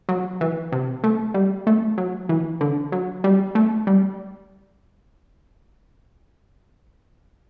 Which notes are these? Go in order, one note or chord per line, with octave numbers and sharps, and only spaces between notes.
F#3
E3
C3
A3
G3
A3
F#3
E3
D3
F#3
G3
A3
G3